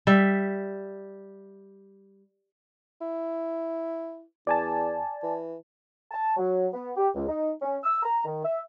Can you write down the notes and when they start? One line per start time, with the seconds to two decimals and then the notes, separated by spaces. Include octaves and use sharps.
0.07 G3 E5
3.02 E4
4.47 E2 D5 G#5 A5
5.23 E3
6.11 A5
6.37 F#3
6.74 B3
6.97 G4
7.15 C#2
7.28 D#4
7.62 C#4
7.84 E6
8.03 A#5
8.25 D#3
8.44 E5